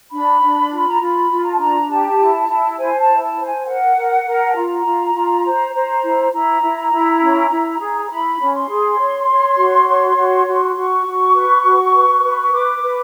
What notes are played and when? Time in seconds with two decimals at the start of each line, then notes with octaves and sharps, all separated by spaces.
0.11 D4 B5
0.41 D4
0.71 F4
0.88 A#5
1.01 F4 B5
1.30 F4
1.44 A#5
1.52 A5
1.58 D4 A#5
1.89 G4 A5
2.18 E4
2.48 E4
2.78 C5 G#5
2.99 A5
3.07 E4
3.22 A5
3.36 C5
3.45 G#5
3.66 A#4 F#5
3.96 A#4
4.25 A#4
4.50 A5
4.54 F4 A#5
4.85 F4
5.14 F4
5.43 C5
5.73 C5
6.03 E4
6.32 E4 A#5
6.62 E4
6.92 E4
7.21 C#4
7.51 E4
7.79 G#4
8.10 E4 B5
8.39 C#4
8.53 C6
8.69 G#4
8.99 C#5
9.28 C#5
9.57 F#4
9.87 C#5
10.17 F#4
10.46 F#4
10.76 F#4 C#6
11.06 F#4
11.35 B4
11.65 F#4
11.93 B4
12.23 B4
12.53 B4 D6
12.82 B4